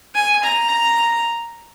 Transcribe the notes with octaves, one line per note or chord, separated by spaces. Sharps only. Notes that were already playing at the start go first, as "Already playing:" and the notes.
G#5
A#5